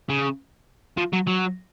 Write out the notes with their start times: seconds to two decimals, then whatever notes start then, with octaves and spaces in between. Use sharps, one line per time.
0.09 C#3
0.97 F3
1.13 F#3
1.27 F#3